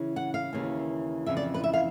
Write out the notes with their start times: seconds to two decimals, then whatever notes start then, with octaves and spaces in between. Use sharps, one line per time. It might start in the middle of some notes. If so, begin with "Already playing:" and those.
Already playing: C#3 E3
0.16 F#5
0.34 F5
0.53 D#2 C#3 E3
1.26 F2 C#3 E3 E5
1.37 D5
1.54 B4
1.64 E5
1.74 F5